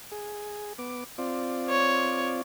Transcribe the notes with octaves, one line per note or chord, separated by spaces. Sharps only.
G#4
B3 D6
C4 F4 D5
C#5